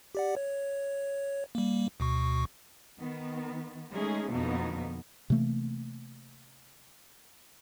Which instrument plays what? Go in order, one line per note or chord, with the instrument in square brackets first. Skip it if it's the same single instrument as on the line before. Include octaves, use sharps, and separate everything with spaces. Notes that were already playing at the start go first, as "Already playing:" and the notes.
[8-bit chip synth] G4 D5 F#5
C#5
G3 A#3
D2 B2 C#6
[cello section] D#3 B3
G#3 A3 C#4 D#4 G#4
F2 B2 D3 A#3 B3 D#4
[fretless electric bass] C3 E3 A3 A#3